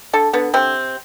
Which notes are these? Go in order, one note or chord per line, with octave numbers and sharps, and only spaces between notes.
D3 A4
D3 B3
C3 C4